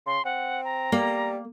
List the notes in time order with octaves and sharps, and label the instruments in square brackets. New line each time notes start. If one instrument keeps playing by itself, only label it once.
[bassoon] C#3 [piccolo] C6
[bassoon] C4 [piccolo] F#5
[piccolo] A#5
[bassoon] G3 [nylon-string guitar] A#3